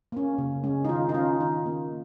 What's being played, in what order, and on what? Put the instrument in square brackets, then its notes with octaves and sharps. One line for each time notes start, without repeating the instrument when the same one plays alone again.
[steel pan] A#3 C#4
C#3
G#3 C#4
D#4
D#3 F4
D#4
C#4 F4
D#3 D#4
A#3 C#4